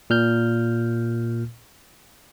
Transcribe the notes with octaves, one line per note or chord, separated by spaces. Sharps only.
A#2 F6 G6